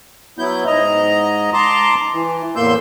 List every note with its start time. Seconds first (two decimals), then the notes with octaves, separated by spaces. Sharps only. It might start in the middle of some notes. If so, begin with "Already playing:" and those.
0.39 F#3 B3 E4 G6
0.67 G#2 D#5 A#5
1.53 A5 A#5 C6 D6
2.13 E3
2.56 E2 A2 A#3 C6 E6 G6